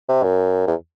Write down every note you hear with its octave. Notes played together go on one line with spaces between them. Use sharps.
C3
F#2
E2